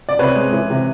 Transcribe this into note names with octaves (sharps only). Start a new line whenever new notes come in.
D5
C3 B4 C#5
G#3
E3
C3